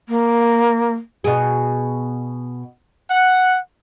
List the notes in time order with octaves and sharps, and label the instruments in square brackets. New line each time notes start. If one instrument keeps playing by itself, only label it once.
[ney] A#3
[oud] B2 G#4
[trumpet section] F#5